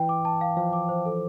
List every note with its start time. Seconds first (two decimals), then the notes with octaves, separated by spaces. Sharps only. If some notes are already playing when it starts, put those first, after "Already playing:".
Already playing: E3 G5
0.09 D6
0.25 A5
0.41 F5
0.57 F3 F5
0.73 D6
0.89 C5
1.06 A4